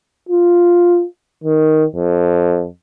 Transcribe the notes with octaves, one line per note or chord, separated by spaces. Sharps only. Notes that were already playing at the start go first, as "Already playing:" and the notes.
F4
D#3
F2